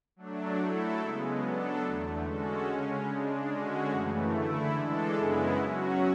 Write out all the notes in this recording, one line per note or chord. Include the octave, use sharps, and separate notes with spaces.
F#3 A3 D4
F#3 A3 E4 A4
C#3 G#3 B3
F#3 B3 D4 A4
E2 D3 A3
D3 G#3 C#4 F#4 A4
C#3 G#3 C#4
C#3 G#3 D4
D3 G#3 C#4 F#4
F#2 C#3 E3 A3
D3 A3 E4
E3 G#3 D4 A4
F#2 C#3 G#3 B3 E4
F#3 C#4 F#4